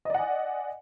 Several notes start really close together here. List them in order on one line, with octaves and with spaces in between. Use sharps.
D#5 D5 F#5 G#5